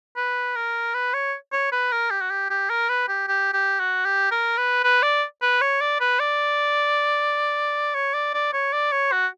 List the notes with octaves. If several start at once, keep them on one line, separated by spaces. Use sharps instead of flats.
B4
A#4
B4
C#5
C#5
B4
A#4
G4
F#4
G4
G4
A#4
B4
G4
G4
G4
F#4
G4
A#4
B4
B4
D5
B4
C#5
D5
B4
D5
C#5
D5
D5
C#5
D5
C#5
F#4